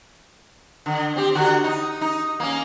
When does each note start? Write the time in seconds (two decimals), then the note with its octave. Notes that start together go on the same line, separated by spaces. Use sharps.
0.86 D3
1.16 C4 G4
1.35 D3 F#4
1.64 D#4
2.01 D#4
2.40 A#3 C#4